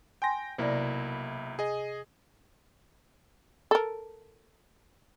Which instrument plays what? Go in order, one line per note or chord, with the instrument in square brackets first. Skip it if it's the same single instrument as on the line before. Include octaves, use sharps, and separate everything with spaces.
[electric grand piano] G5 A#6 [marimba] G#5 C6
[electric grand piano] B1 A#3 E4 [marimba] C3 D5
[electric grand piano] G#4 D#5
[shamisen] A4 A#4